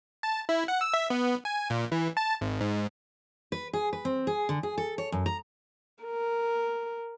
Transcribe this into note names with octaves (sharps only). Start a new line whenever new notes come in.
A5
E4
F#5
E6
E5
B3
G#5
A#2
E3
A5
G#1
G#2
B4
G#4
B4
C4
G#4
D3
G#4
A4
C#5
F#2
A#5
A#4